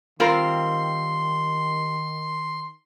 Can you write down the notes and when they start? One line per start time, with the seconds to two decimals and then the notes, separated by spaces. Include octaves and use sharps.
0.20 D#3 G3 C4 F4 A#4 C6